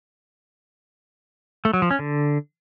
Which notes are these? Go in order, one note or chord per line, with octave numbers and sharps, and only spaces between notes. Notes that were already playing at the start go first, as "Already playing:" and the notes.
A3
F#3
F3
C#4
D3